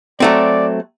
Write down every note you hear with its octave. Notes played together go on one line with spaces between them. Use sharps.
F#3 A3 C4 D5